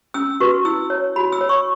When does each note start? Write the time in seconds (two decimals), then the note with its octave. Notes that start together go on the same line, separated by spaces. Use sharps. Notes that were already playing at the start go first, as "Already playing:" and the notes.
0.14 C#4 E6
0.40 F#4 B4 C#6
0.65 E4 E6
0.90 C#5
1.16 F#4 B5
1.32 E6
1.41 C#5
1.49 C#6